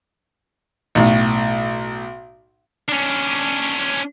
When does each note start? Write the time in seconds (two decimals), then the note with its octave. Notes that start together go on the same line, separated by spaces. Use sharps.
0.95 B1 A2
2.89 C#4 D4